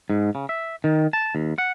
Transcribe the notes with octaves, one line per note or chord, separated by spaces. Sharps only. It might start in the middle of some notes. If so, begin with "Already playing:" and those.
G#2
C#3
E5
D#3
A5
D#2
F#5